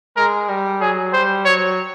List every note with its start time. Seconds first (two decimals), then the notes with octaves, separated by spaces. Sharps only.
0.17 G#3 A#4
0.49 G3
0.81 F#3 G#4
1.13 G3 C5
1.45 F#3 C#5